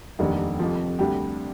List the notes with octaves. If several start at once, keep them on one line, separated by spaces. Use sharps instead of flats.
F1 D#2 D#3 G3 D4
F2 C3 F3
D2 C3 G3 D4 G4